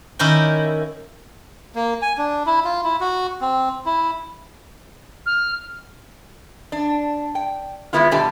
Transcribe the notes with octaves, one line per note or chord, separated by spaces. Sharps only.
D#3 C#4 E4 A#4 D5 G5
A#3
G#5
D4
E4
F4
E4
F#4
C4
E4
F6
D4
G5
E3 G3 G#3 B3 E4 F4
B2 D3 G3 G4 G#5 A5